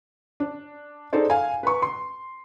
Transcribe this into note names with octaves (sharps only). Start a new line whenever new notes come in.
D4
D#4 G#4 A4 C5 D5
F5 G#5
B4 A#5 C#6
C6